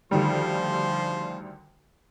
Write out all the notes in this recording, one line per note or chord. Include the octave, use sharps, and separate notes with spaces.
D2 D#3 F3 G3 C6